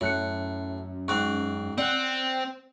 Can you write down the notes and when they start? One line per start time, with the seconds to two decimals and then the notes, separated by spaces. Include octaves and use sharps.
0.01 F#2 A2 C#5 F#6 C#7
1.08 G#2 C4 C#6 F#6
1.78 C4 D5 F#5 F#6